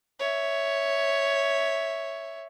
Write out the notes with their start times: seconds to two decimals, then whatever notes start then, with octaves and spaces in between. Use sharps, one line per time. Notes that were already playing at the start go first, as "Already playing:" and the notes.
0.19 C#5 E5